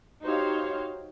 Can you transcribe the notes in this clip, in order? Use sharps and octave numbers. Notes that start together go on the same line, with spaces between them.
D#4 F#4 G4 C5 C#5 F5